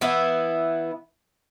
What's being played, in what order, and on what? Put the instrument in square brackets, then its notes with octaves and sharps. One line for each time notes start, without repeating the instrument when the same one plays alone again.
[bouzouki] E3 B3 E4